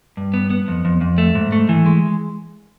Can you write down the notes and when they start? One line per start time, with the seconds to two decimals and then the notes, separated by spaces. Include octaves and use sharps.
0.17 G2
0.34 B3
0.50 B3
0.68 F2
0.85 F2
1.01 F2
1.18 A3
1.35 G#2
1.52 A3
1.69 E3
1.86 G#3